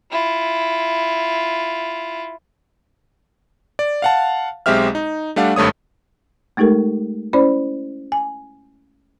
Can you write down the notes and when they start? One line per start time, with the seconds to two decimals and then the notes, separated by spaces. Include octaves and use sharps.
0.11 E4 F4
3.79 D5
4.02 F5 F#5 A5
4.66 B1 G#3 C4 G4 E5 F6
4.95 D#4
5.36 G3 A3 D4 F5 F#5
5.56 G#1 G2 A3 C#5 D#6
6.57 G#3 A3 D#4 G4 A4 A#4
7.33 C#4 E4 C5 D5 B5
8.12 G#5